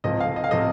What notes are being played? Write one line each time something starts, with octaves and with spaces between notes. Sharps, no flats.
C#2 C3 F3 D#5
F5
D#5
F5
C3 F3 D#5